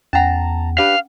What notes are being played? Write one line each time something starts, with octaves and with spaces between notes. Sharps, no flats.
E2 C#4 F#5 A5 A#5
D4 G4 B4 F5